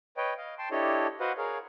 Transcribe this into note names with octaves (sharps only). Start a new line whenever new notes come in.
B4 C#5 D#5 G5
D#5 F5
G5 A5 C6
D4 E4 G4 A4 C#5 D#5
F#4 B4 C5 D#5 F5 F#5
G#4 A#4 C#5 F5